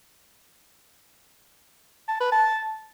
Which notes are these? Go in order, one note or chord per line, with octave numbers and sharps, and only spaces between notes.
A5
B4
A5